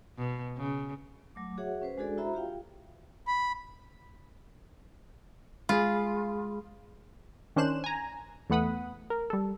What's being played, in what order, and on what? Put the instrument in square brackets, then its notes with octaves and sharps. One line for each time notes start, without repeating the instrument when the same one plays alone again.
[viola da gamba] B2
C#3
[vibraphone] F#3 A3 D6
F#4 G#4 C#5 E5 F#5
C#4 B4 C5
G#3 D4 F#4 G#4 A4 D5
E4 F#4 C5 E5 A#5 B5
F4 G4 F5 G5
[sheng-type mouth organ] B5
[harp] G#3 [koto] F4 [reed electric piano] G#4 B5
[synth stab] D#3 C#4 D4 C5 F#6 E7
G#5 A#5
E2 A3 B3 F#5 B5 D#6
A#4
G3 A4